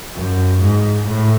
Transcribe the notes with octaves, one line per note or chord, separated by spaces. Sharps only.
F#2
G#2
A2